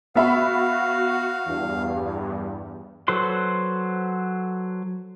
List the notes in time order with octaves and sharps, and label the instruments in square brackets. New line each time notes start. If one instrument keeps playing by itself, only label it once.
[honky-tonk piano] B3 E5 B5 [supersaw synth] F#4 [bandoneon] F5
[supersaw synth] E2 G2
[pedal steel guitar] F#3 A4 B4 C5 C6